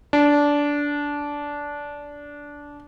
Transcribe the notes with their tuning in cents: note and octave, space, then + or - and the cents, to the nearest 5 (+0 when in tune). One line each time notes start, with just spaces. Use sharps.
D4 -15